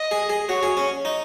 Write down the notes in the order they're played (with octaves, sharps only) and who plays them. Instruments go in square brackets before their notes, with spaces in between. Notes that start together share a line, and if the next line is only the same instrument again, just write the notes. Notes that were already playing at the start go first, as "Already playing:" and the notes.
Already playing: [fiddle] D#5
[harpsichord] G#4
G#4
[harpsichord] F#4 [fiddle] C#5
[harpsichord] G#4
C#4
D#4